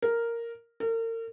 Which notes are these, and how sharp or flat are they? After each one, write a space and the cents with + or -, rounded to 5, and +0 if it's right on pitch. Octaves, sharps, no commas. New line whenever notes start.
A#4 -5
A#4 -40